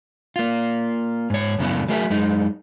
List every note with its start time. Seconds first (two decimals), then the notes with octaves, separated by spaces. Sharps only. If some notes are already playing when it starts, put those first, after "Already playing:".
0.36 A#3 F4
1.30 G#2 C#5
1.59 F#2 A2 C#3 A3 B3 E4
1.89 F#3 A3 G#4 A#4 D5 E5
2.10 F#2 G#3 D#4